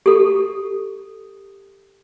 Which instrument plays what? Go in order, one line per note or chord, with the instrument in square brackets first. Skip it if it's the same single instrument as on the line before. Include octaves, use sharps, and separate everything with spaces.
[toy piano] G4 A4